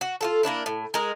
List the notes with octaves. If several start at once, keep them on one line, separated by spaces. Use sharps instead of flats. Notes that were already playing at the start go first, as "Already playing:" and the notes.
F#4
F4 F#4 A4
A#3 B3 D4 E4
A2
G#3 A#4